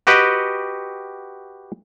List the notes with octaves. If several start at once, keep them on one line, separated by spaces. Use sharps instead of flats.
F#4 G4 B4 D#5 F#5 G5